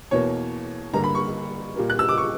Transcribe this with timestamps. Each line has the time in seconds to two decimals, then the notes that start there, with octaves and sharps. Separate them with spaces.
0.11 E2 B2 A#3 C#5
0.93 G2 D3 A#3 A#5
1.04 B5
1.15 C#6
1.76 A#2 G3 A#3
1.90 F#6
1.99 E6
2.08 D6
2.17 C#6